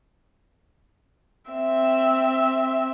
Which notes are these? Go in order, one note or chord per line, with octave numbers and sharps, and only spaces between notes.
C4 E5